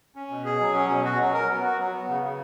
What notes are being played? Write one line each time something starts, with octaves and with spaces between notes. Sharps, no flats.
C#4
B2
G#4
F#3
C#4
B2
F#4
F#3
A#4
B3
F#4
F#3
B3
C#3
C#3